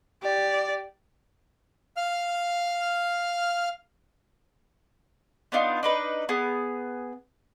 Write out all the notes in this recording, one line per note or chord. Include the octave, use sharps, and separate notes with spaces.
G4 D5
F5 F6
B3 D4 D#4 F4
D4 D#4 B4
B3 G#4